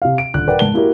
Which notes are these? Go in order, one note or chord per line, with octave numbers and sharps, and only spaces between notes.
C3 F5
D7
D#1 D3 F#6
A#4 B4 D5 F#5 G5
G#2 A5 G7
A#3 E4 F#4 G4 A#4